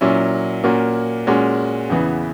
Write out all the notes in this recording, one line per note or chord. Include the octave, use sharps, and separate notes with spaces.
A#2 F#3 C#4 E4
A#2 A#3 C#4 F#4
A#2 G#3 C#4 F#4
E2 C#3 E3 B3